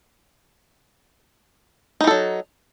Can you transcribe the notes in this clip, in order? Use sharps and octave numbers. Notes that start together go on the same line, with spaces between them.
E3 F#3 D#4 A4